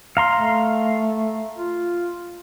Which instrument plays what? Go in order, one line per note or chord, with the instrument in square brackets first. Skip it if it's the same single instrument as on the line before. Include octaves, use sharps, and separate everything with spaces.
[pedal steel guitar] F5 A#5 C6
[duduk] A3
F4